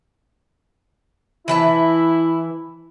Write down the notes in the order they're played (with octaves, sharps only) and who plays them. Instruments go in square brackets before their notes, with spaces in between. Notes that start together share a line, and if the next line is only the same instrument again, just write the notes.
[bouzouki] E3 B4 A5 [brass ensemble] E4